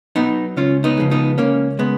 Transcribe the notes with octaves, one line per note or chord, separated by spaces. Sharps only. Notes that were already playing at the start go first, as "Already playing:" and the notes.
F#3 B3 D#4
C#2 C#4 F4
B3 D#4
C#3 F3 G#3
B3 D#4
C#2 A#3 C#4
C#3 G#3 B3